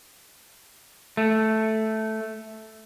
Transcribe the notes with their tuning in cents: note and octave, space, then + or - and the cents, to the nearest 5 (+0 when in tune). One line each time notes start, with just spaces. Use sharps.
A3 -5